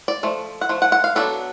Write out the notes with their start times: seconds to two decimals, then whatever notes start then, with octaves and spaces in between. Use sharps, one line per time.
0.08 D5
0.23 F3 A3
0.61 F#5
0.69 F3 A3
0.82 F#5
0.92 F#5
1.04 F5
1.16 F#3 B3 D4 A4